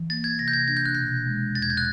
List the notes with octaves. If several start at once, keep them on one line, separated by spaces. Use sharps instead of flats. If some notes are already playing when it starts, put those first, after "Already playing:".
Already playing: E3
A#3 A6
G#6
C3 A#6
G6
G#6
D4 G#6
G6
F#6
B2 G6
G#3
E2 A6
G#6
G6
F#6